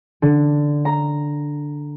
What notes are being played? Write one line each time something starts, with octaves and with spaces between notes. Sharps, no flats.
D3
A#5